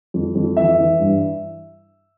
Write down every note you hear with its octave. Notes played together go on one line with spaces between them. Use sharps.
F2
F2
E3 E5
E3
G2